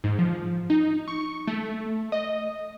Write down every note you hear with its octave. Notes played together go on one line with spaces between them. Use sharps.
G#2
F3
D#4
C#6
A3
D#5